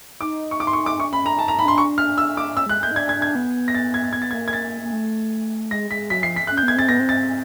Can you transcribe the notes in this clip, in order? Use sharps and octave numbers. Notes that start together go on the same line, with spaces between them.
D#4 D6
C#6
D6
C6
C#6
D6
D4 C#6
C#4 B5
D4 A#5
D#4 A5
A#5
D#4 B5
D4 C6
C#6
F6
E6
D6
C#4 E6
G#3 F#6
G6
A#3
D#4
D4 G#6
G#6
D4
G#6
B3
A#6
A6
G#6
A6
B3 G#6
A6
G#6
A#3
G#6
A6
A#3
A3
G#3 A#6
G#3 B6
F#3 B6
F3 C7
B6
C#4 F#6
G6
B3
G#6
C4 A6
B3 A#6
C4
A6